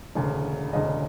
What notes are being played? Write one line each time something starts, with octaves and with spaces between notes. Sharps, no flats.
E1 D2 C#3
E1 D2 C#3 D#5